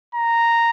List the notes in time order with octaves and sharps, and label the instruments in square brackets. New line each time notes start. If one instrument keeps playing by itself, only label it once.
[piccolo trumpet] A#5